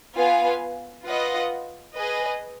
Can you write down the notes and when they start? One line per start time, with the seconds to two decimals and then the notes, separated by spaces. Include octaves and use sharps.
0.15 B3 F4 B4 F5 G#5
1.05 F4 B4 D#5 F#5
1.95 G#4 B4 D#5